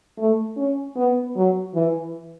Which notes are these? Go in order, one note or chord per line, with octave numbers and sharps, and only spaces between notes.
A3
C#4
B3
F#3
E3